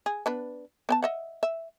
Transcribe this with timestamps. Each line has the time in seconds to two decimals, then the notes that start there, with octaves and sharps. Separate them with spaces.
0.06 G#4
0.26 B3 D4 B4
0.89 B3 G5 A5
1.02 D#5 E5 F#5
1.43 E5